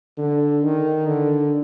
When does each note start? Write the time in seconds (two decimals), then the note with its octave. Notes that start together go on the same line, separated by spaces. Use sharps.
0.18 D3
0.62 D#3
1.07 D3